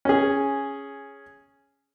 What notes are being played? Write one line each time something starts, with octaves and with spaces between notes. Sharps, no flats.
C#4 G#4